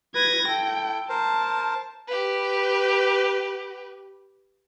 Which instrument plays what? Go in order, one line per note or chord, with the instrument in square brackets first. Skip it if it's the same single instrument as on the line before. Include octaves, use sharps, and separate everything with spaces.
[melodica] B4 [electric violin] G#6 A#6
[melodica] E4 A4 [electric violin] G5
[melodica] A#4 C5 [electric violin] A5
[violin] G4 B4